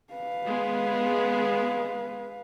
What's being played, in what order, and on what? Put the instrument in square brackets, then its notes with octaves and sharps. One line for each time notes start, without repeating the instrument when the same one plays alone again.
[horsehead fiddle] B4 F5
[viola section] G#3 B3 G#4